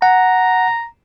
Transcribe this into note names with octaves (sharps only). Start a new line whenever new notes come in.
F#5 A#5